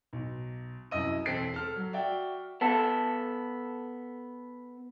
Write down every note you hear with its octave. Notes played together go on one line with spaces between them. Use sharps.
B1
C2 F#2 E4 D#5 E6 D#7
E1 C4 A4 B6 C7 D7
A4 F6
F#3
F#4 D5 E5 G5
B3 A4